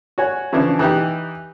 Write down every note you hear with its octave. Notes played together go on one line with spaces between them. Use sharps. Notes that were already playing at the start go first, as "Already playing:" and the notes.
F#4 C#5 G#5
C#3 E3 F3 D4
E3 D#4 G4